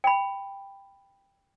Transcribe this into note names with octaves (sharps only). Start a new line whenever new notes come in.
G5 B5